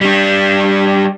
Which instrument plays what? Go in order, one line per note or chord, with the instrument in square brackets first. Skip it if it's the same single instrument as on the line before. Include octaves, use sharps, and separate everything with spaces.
[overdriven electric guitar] G3 D4